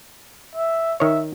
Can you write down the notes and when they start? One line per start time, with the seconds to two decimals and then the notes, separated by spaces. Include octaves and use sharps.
0.55 E5
1.00 D#3 C#5 E5